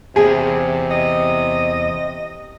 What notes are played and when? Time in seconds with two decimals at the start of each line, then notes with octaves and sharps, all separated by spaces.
0.16 E2 C3 G#4
0.91 D#5